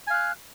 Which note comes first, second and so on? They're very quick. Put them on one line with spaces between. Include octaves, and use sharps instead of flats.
G#5 F5 F#6